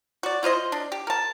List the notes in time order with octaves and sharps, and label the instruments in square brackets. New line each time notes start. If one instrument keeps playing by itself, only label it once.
[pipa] F#4 D5
E4 F4 C5 D#5
D4
G4
A#4 A5